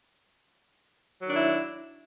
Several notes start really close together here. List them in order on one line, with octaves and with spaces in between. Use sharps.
F#3 D#3 D4 E4